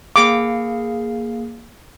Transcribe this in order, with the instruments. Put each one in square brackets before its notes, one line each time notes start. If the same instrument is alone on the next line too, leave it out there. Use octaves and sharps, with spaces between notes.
[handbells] A#3 G#4 F5 [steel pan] D6